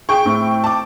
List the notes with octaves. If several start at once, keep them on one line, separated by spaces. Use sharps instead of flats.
G#4 G5 C#6
A2 C4
A5 D6